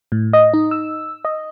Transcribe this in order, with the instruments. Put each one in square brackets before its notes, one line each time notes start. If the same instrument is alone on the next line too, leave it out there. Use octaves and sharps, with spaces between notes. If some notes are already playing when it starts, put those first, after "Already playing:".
[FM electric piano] A2
D#5
D#4
E6
D#5